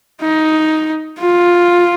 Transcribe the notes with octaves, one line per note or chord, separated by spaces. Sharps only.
D#4
F4